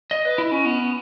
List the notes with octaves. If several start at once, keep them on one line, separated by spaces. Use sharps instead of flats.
D#5
B4
E4
C#4
B3